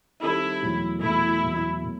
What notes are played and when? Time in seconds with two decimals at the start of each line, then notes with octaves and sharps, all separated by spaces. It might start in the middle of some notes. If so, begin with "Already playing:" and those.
0.22 D#3 G3 C4 D#4 E4 A4
0.62 E2 B2 F#3 A3
1.02 E2 B2 F#3 A3 E4
1.43 E2 B2 F#3 A3
1.82 B2 F#3 A3